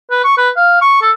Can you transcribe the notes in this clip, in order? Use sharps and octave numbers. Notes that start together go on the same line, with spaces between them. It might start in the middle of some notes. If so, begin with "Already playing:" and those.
B4
C#6
B4
F5
C#6
A4